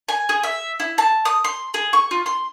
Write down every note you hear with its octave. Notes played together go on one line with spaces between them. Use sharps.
G#5
G#4
E5
E4
A5
D#6
C6
G#4
C#6
F4
C6